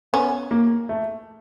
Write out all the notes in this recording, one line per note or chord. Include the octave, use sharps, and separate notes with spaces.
B3 C#4
A#3
A3